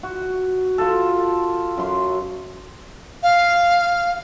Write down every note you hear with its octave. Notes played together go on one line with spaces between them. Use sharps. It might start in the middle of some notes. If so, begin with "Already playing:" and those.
F#4
F4 A4
F#2 C6
F5